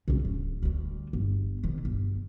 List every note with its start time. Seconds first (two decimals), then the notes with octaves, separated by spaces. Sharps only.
0.08 C#2 C#3
0.25 D1
0.63 D2 G3
1.13 G1
1.64 C3 D#3
1.85 G1